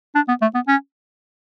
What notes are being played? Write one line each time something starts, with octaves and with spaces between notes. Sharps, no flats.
D4
B3
A3
B3
C#4